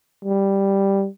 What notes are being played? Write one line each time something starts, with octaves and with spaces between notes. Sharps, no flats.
G3